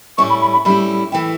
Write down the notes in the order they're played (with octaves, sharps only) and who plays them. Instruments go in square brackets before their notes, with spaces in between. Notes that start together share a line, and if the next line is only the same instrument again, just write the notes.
[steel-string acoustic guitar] A2 G3 C#4 E4 [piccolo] C#6
[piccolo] B5
B5
B5
[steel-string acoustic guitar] A2 G3 C#4 E4 [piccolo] B5
[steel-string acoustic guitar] A2 E3 A3 E4 [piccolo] G5